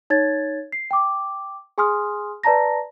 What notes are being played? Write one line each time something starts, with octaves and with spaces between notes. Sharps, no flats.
D#4 C#5 G#6 A6
C7
G5 D6
G#4 G#5 C6 D#6 F6
B4 D5 A5 A#5 A#6